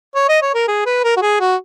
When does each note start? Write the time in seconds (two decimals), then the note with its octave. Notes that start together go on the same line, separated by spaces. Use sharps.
0.15 C#5
0.29 D#5
0.42 C#5
0.55 A#4
0.68 G#4
0.86 B4
1.04 A#4
1.17 F#4
1.22 G#4
1.40 F#4